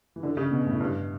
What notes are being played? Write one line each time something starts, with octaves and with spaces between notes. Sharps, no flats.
E3
D3
C#3
B2
A2
G2